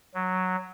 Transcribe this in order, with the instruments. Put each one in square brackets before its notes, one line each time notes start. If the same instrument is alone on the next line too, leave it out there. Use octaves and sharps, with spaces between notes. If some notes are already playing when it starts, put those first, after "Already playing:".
[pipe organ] F#3